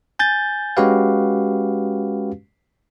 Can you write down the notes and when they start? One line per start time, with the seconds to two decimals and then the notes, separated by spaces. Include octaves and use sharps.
0.19 G#5 G6 A6
0.77 G#3 C#4 F#4 G4 B4 F5